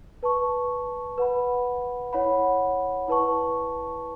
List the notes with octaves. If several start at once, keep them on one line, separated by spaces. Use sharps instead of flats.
B4 A5 C#6
B4 F#5 B5
E4 C#5 F#5 B5
E4 B4 A5 C#6